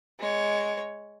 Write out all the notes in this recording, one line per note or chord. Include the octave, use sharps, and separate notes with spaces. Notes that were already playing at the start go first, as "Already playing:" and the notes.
G#3 C#5